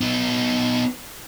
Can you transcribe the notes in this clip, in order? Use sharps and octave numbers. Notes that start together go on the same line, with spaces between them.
B3 D#4